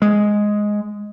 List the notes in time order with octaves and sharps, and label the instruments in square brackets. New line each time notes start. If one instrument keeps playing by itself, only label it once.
[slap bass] G#3